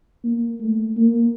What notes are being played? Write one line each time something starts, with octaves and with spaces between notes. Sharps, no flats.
A#3
A3
A#3